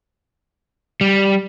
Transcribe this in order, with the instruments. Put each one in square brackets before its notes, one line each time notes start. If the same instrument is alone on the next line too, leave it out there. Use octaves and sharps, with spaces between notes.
[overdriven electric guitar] G3